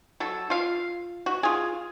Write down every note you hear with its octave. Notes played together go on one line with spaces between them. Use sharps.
F#3 A4
F4 F5
F#4
F4 G#4